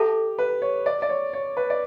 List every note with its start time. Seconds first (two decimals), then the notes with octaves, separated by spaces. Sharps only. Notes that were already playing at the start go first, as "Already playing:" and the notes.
Already playing: G4 A4 E5 A5
0.38 B4
0.62 C#5
0.86 D5
1.02 D5
1.09 C#5
1.33 C#5
1.57 B4
1.70 D5